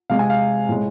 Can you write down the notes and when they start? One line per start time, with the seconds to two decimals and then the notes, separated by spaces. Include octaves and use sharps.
0.10 C3 G#3 F5
0.19 G#5
0.30 F5
0.69 A2 G#3